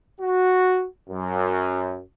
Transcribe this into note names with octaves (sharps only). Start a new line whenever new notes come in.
F#4
F#2